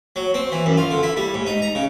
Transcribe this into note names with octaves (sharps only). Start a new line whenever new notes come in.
F#3
C4
E3
F#2
F4
D3
E4
G3
G#2
D#4
A#5
C#3